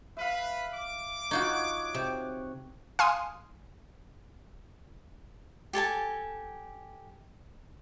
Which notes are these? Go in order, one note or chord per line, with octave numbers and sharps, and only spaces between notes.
B4 E5 F5
D6
D#4 F4 F#4 C#5 F#5
C3
F5 G#5 C6 D#6
G4 A4 G#5 A5